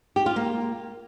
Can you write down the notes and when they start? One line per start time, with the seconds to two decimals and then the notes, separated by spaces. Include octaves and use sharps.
0.16 G4
0.26 F4
0.36 A#3